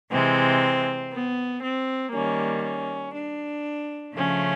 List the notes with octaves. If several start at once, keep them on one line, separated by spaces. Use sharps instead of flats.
C3 E3 G#3 C4
B3
C4
D#3 G3 A#3 C#4
C#4
D4
C#3 F3 A3 C#4